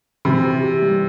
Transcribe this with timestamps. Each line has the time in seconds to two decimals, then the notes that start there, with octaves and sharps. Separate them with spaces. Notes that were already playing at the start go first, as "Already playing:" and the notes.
0.25 C3 E3
0.44 G4
0.63 G4
0.82 G3